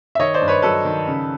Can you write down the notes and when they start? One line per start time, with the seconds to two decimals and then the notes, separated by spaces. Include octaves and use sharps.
0.15 E5
0.19 D#3 C#5 D#5
0.34 C5 D5
0.41 G2
0.48 B4 C#5
0.62 F#3 A4 B4
0.85 D#3
1.07 C#3